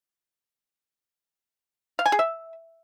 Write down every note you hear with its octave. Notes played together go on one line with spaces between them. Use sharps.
F5
G#5
G#4
E5